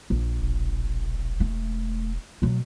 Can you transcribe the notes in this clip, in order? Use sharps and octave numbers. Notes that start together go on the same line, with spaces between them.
A#1
E1
A3
B2 F#3 A3